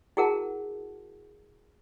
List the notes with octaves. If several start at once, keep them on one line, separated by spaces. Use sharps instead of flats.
E4 F#4 G#4 A#4 F#5 A5